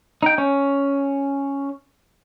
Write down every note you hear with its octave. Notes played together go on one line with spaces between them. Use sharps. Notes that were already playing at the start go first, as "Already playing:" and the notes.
D#4 G5
C#4